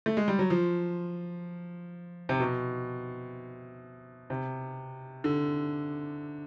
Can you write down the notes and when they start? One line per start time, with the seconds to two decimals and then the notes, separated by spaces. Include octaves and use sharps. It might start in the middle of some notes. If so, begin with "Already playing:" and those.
0.06 A3
0.17 G#3
0.28 G3
0.39 F#3
0.50 F3
2.29 C3
2.40 B2
4.30 C3
5.24 D3